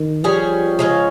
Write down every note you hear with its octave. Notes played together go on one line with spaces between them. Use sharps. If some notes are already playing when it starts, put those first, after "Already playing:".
Already playing: D#3
F3 G3 C#4 G#4
C#3 G#3 C#4